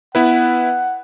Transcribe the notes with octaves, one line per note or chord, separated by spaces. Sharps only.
B3 E4 B4 F#5